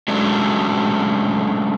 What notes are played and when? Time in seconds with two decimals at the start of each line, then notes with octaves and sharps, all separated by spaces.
0.08 F#3 G#3 A3 C#4 D4